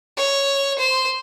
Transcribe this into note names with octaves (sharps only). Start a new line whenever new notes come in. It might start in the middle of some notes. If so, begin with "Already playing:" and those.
C#5
C5